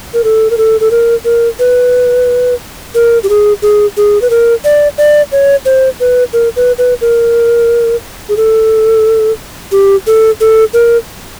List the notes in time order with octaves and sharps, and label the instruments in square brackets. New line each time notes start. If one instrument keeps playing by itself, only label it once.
[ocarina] A#4
A4
A#4
A4
A4
A#4
A#4
B4
A#4
G4
G#4
G#4
G#4
B4
A#4
D5
D5
C#5
C5
B4
A#4
B4
B4
A#4
G#4
A4
G4
A4
A4
A#4